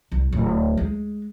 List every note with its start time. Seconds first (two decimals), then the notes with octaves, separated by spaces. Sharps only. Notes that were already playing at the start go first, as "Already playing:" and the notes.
0.12 C2
0.33 D1
0.77 G#3